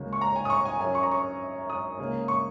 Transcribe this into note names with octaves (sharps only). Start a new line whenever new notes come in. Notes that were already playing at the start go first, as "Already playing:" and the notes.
Already playing: C#2 C#3 F#3 A#3 C#4
C#6
A#5
G#5
D#6
C#6
G#5
F#2 F#3 C#4 G#5
C#6
A#5
C#6
D#6
C#2 C#3 A#3 C#4
C#6